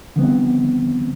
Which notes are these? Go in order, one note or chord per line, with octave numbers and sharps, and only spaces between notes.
D3 D#3 F3 G3 B3 C4